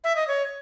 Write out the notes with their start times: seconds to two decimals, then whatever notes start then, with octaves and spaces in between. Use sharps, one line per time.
0.04 E5
0.16 D#5
0.28 C#5